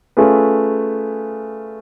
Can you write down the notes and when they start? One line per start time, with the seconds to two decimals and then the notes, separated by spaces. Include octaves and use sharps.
0.17 A3 C#4 F4 G#4 B4